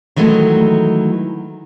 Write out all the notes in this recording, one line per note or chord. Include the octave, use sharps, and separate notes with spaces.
D#3 E3 F#3 G#3 A3